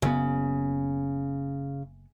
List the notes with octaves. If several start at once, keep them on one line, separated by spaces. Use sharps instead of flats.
F#1 C#3 B3